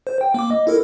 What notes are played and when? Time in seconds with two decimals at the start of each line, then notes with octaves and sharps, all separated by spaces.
0.07 C5
0.21 G5
0.34 A#3 D6
0.51 D#5
0.67 E4 A4 A#4